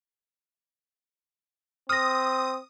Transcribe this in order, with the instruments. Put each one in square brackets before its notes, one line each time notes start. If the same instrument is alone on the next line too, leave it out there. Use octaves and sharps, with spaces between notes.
[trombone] C4 [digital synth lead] D#6 [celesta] F6 A#6